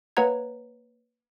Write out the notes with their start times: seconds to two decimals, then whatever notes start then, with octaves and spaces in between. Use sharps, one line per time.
0.17 A#3 B4 C#5 F#5 A#5 G#6